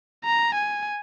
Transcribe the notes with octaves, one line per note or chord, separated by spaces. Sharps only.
A#5
G#5